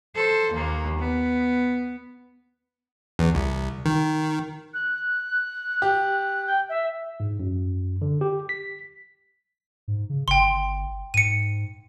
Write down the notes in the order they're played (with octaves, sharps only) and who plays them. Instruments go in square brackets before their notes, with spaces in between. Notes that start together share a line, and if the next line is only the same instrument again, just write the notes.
[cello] A4 C5
D#2 A#3
B3
[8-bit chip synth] E2
C2
D#3
[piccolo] F#6
[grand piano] G4
[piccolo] G5
E5
[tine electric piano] G#2
F#2
D3
G4
B6
[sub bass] G#2
C#3
[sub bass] G1 [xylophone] G5 C6
[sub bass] G#2 [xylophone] C#7 D#7